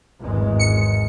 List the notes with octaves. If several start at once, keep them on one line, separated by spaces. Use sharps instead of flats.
G#1 E2 G#3
C#7